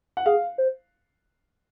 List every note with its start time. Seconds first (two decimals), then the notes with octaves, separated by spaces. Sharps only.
0.17 F#5
0.26 G#4 F5
0.58 C5